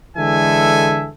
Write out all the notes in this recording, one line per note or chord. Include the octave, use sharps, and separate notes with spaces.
D3 E3 G#3 A4 E5 G#5